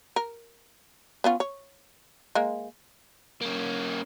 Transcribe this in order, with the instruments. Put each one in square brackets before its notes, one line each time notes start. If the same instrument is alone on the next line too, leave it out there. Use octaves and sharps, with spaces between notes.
[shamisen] A#4
B3 C#4 F4
C#5
G#3 A#3
[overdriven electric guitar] A#3 C#4